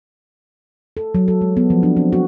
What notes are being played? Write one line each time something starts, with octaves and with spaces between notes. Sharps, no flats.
A4
F#3
A4
G#3
B3
F3
D4
C4
F#4